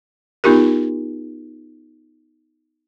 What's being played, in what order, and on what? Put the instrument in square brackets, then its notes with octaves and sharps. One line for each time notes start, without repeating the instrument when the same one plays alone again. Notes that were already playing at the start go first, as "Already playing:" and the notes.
[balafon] B3 D#4 F4 G4 A#4